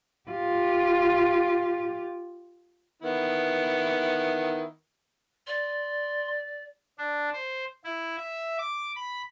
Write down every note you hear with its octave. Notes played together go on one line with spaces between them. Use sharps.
F4 G4
D#3 B3 E4
D5 C6
D4
C5
E4
E5
D6
B5